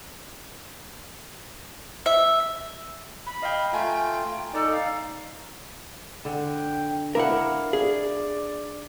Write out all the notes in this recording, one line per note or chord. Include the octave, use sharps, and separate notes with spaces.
E5
B5
D#5 F5 G5
A3 F4 G5 G#5 A#5
D#4 A4 D5
F5
D3 G5
D4 E4 A#4 F5 F#5
G#4 D5